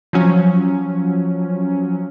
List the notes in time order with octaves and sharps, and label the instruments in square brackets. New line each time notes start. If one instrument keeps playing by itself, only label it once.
[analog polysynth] F3 F#3 C#4